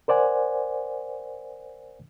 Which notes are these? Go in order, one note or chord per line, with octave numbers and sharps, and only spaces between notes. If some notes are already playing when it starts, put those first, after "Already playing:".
A#4 C5 D5 F#5 G#5